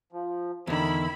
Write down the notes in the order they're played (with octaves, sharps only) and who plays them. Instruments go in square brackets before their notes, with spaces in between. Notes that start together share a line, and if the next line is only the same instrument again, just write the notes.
[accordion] F3
[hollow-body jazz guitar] E2 D3 [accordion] D#3 [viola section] E4 B5